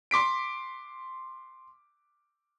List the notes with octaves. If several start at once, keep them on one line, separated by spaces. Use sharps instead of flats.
C6 D6 B6 D7